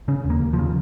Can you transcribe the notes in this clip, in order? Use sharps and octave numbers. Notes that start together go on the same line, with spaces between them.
C#3 C#4
D#2
A#3
D#2
F3
C#3